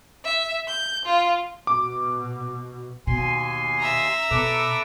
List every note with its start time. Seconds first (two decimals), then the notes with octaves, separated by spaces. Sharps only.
0.24 E5
0.68 G6
1.06 F4
1.67 B2 D6
3.07 D#2 B2 G#5 C6
3.79 E5 A#5
4.31 B2 A4 B4 D6